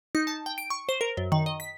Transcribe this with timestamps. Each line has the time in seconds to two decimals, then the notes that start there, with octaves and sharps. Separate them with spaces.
0.15 D#4
0.27 A5
0.46 G5
0.58 D7
0.70 C#6
0.89 C5
1.01 A#4
1.17 F#2
1.32 D#3
1.46 D#5
1.60 B6